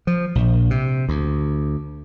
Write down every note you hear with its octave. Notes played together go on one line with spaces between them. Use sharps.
F3
A#1
C3
D2